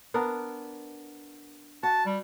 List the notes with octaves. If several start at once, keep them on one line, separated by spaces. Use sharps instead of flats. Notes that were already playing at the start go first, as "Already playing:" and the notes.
B3 D4 A#4
F#4 A5
G3